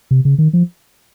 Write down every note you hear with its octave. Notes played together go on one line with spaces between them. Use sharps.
C3
C#3
D#3
F3